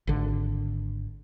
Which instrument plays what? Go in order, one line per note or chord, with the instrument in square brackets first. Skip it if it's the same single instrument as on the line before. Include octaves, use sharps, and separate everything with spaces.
[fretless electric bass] G#1 D3